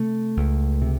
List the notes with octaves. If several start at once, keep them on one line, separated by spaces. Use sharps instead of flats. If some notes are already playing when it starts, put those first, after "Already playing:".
Already playing: C3 A3
C#2
C3